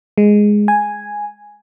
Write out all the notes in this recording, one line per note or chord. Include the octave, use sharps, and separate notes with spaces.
G#3
G#5